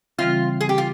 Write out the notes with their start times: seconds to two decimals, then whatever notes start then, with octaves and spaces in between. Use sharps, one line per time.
0.18 C#3 E3 G3 C4 F4
0.61 G#4
0.69 G4
0.78 F4